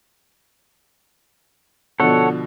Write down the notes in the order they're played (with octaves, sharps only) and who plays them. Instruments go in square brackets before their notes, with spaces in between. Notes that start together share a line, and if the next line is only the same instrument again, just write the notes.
[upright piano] B2 D3 F3 [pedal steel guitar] A4 C#5 F#5